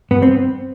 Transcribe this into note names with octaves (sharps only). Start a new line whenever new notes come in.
G2 B3
C4